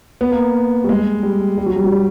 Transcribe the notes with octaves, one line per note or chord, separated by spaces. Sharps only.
B3
A#3
G3
G#3
G3
G3
F#3
G3
F#3
G3